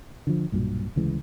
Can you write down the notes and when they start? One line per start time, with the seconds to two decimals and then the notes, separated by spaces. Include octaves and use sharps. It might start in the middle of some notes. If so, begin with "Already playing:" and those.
0.27 D3 F3
0.52 B1 G2 A#2 F#3
0.96 D2 C#3 E3 G#3